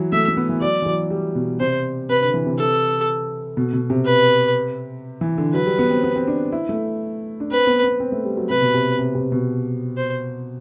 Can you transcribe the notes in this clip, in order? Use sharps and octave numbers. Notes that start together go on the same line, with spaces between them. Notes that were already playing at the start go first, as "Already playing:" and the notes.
Already playing: E3 F#3
A3 E5
A3
B3
E3
F#3 D5
E3
F#3
G3
B2
C3 C5
C3 B4
D3
E3
C3
A4
B2
B2
C3
B4
E3
D3
F#3 B4
G3
B3
C4
B3
C4
D4
E4
A3
D4
C4 B4
B3
B3
C4
A3
G3
F#3
C3 B4
B2
C3
C3
C3
B2
C5